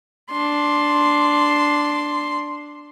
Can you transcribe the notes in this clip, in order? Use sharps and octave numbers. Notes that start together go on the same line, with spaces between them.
D4 C6